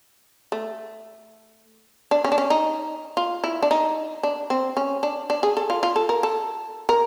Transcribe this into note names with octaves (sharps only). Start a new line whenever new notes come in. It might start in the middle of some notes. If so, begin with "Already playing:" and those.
A3
D4
C#4
D4
C#4
D#4
F4
E4
D4
D#4
D4
C4
C#4
D4
D4
G#4
A4
F4
F4
A4
A#4
A4
A#4